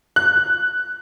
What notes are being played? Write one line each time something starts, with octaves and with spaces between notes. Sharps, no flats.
F#6